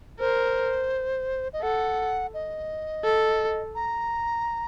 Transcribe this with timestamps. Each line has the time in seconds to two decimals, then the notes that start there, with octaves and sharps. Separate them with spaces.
0.20 A#4 C5
1.53 D#5
1.62 A4 F#5
2.34 D#5
3.04 A4
3.75 A#5